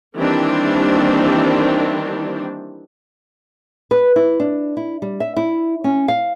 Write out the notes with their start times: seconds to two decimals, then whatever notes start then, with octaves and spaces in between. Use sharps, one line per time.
0.16 D#3 E3 G3 A#3 C4 D4
3.91 B4
4.16 E4
4.40 D4
4.77 E4
5.02 G3
5.20 E5
5.37 E4
5.84 C#4
6.08 F5